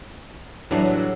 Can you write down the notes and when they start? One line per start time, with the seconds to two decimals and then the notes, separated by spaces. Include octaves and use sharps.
0.71 A2 E3 F#3 G3 D4